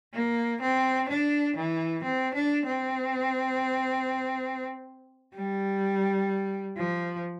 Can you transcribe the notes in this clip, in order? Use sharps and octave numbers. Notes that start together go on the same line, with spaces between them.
A#3
C4
D4
E3
C4
D4
C4
G3
F3